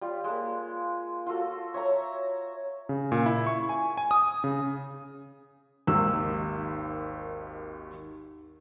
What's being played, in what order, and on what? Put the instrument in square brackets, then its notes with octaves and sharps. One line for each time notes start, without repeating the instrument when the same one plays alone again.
[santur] G3 F4
G#3 A#3
F4 F#4 A4
C#5 E5 A#5
[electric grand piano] C#3
A#2
E4
C#6
G#5
G#5
D#6
C#3
[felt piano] G#1 D#2 E6